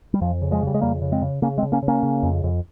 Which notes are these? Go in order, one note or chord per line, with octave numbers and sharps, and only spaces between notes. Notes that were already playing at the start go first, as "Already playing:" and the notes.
G3
F2 F3
C#3
F3 G#3
C#3 G3
G#3
F2 G3 A#3
C#3
G#3 C4
C#3
C#3 A#3 C#4
G#3 C4
C#3
A#3 C#4
C#3
A#3 C#4
C#3
F2
F2